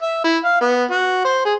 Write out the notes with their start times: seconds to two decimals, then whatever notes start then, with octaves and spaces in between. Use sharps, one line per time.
0.02 E5
0.24 E4
0.44 F5
0.61 B3
0.91 F#4
1.25 C5
1.45 G#4